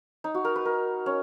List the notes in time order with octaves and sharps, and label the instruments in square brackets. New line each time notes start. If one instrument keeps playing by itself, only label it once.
[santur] D#4
F#4
A#4
B4
A#4
C#4